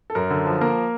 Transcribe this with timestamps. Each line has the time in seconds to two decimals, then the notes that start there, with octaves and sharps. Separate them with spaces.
0.10 A4
0.15 F#2 A#4
0.30 D3
0.46 F3
0.61 A#3 A#4